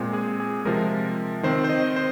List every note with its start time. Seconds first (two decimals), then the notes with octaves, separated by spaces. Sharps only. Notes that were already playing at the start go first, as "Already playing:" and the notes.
Already playing: A#2 G#3 C4
0.13 G#4
0.40 G#4
0.65 C3 F3 G#3 A#4
1.43 D#3 C4 C5
1.64 C5
1.69 D#5
1.96 C5